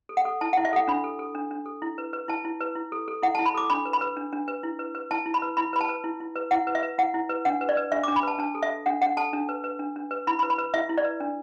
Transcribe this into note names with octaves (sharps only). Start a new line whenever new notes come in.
A4
F#5
A4
E4 A5
F#5
E4
E5
A4 F#5
D4 B5
A4
A4
D4
D4
A4
E4
B4
B4
E4 A5
E4
B4
E4
A4
A4
E4 F#5
A5
E4
B5
A4 D6
D4 B5
B4
B5
B4
D4
D4
B4
E4
B4
B4
E4 A5
E4
B5
B4
E4 B5
B4 B5
A5
B4
E4
E4
B4
E4 F#5
B4
E5
B4
E4 F#5
E4
B4
D4 F#5
B4
D5
B4
D4 E5
D6
D4
B5
B4 A5
D4 A5
A4
E5
A4
D4 F#5
D4 F#5
A4 A5
D4
B4
B4
D4
D4
B4
E4 B5
B5
B4
B5
B4
E4 E5
E4
D5
B4
D4